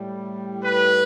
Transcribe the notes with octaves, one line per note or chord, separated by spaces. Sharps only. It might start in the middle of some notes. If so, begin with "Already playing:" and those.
Already playing: A2 G3
B4